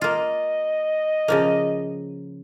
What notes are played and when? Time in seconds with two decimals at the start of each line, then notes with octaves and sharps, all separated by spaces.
0.02 A#3 F4 D#5
1.28 C#3 F3 A#3